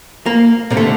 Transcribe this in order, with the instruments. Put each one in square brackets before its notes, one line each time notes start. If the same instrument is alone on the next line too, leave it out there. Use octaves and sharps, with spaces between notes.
[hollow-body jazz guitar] A#3
[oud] C3 [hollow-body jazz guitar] A#3
[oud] D3 [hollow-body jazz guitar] A3